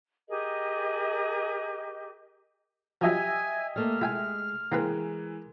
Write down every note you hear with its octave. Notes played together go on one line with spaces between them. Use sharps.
G4 G#4 A#4 D#5
F3 F#3 G4 D#5 E5 G#5
G3 A3 A#3 F6
G#3 E4 G5 G#5
E3 G#3 A#3 C4 A#4 B4